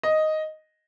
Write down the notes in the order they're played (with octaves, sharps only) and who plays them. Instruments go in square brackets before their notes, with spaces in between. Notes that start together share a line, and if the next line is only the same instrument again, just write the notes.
[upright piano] D#5